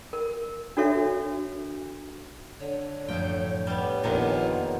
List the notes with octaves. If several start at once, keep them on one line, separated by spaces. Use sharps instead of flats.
A#4
D4 F#4 A4 C#5 E5
D3 C#5
A1 F#2 A2 F3 G5
G3 B3
A#1 F2 A#2 D3 D#3 B3